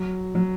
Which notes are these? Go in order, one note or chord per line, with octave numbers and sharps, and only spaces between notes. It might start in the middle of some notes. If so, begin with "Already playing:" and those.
Already playing: F#3
F#3